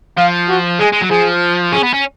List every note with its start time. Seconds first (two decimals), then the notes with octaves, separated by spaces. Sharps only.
0.17 F3 F5
0.49 F#4
0.80 G#3 G#4
0.93 G#3
1.02 F#3
1.10 F3 G#4
1.73 C#4 G#4
1.83 B3
1.93 C#4